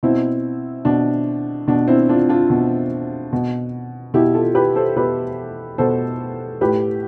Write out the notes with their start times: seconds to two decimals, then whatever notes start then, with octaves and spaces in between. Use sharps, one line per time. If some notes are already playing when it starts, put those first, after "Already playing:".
0.03 B2 C4 E4
0.85 B2 D4
1.68 B2 D4
1.88 C4 E4
2.09 D4 F4
2.29 D4 F4
2.50 B2
3.33 B2
4.14 B2 E4 G4
4.34 F4 A4
4.55 G4 B4
4.76 A4 C5
4.96 B2 G4 B4
5.78 B2 A4 C5
6.61 A2 G4 B4